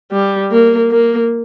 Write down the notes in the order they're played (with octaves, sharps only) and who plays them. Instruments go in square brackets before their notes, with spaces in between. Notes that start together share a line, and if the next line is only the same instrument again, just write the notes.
[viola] G3
A#3
A#3